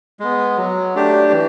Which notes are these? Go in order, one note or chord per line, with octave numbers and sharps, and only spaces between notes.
G#3 B3
F#3
A3 D4 G4
E3